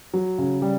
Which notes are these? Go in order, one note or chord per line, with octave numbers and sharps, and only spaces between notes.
F#3
C#3
G3